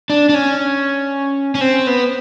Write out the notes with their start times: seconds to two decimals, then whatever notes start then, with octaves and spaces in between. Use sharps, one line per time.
0.10 D4
0.29 D4
0.34 C#4
1.55 C#4
1.61 C4
1.87 B3